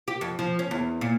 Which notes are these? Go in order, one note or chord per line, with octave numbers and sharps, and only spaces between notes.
G4
F2
F3
C#4
E2
A#2